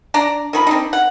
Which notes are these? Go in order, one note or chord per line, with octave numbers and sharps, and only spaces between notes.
D4 D5 A#5
D#3 F3 B5
C4 D4 D#4
F#5